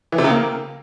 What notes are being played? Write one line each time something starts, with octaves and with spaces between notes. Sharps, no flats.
E3
C3
C#3
A#3